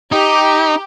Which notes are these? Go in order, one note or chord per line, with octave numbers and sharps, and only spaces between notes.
D#4 G4